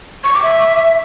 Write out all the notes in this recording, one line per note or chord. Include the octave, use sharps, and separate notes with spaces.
C#6
D6
E5